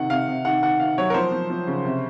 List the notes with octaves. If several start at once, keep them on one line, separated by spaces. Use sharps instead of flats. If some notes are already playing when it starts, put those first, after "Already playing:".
Already playing: C3 D#3 F#5
C3 F5
C3
D#3 F#5
D#3 F#5
D#3 F5
F#3 C#5
A#4
F3 C5
F3
F3
C#3
C3